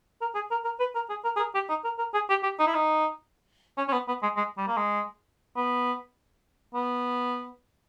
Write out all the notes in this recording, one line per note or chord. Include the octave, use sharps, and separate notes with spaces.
A#4
G#4
A#4
A#4
B4
A#4
G#4
A#4
G#4
A#4
G4
D#4
A#4
A#4
G#4
G4
G4
D#4
E4
D#4
C#4
C#4
B3
B3
G#3
G#3
G3
A#3
G#3
B3
B3